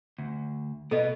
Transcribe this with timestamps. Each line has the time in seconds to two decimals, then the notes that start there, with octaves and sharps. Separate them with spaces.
0.18 D2
0.91 B2 B3 A4 D#5